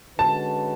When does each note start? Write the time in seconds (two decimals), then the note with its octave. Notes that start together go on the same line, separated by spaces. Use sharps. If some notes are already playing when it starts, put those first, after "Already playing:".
0.18 D3 G#3 C#4 F#4 B4 A5